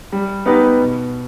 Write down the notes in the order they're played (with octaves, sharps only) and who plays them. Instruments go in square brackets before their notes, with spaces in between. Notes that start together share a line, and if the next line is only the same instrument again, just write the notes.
[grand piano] G3
B3 D#4 G4 B4
B2